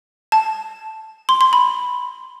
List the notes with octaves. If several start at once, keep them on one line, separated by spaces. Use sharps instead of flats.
A5
C6
C6
B5